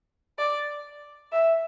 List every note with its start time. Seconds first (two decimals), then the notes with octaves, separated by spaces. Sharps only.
0.38 D5
1.32 E5